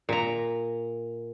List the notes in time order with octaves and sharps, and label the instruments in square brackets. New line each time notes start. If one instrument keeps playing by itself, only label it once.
[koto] A#2 A#5